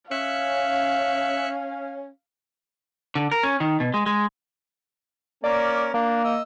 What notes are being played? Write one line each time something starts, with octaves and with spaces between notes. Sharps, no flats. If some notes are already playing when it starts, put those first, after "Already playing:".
C#4 E5 F5 F#6 C#7
D3
A#4
C#4
D#3
B2
G#3
G#3
A#3 C#4 A#4 D5
A#3 D4 A#5
D#5 E6